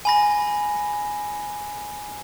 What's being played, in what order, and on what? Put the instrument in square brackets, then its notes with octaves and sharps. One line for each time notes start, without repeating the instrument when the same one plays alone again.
[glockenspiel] G#5 B5 A#6